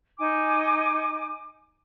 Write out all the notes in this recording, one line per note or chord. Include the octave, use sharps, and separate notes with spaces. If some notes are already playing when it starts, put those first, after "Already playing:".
D#4 G#5 D6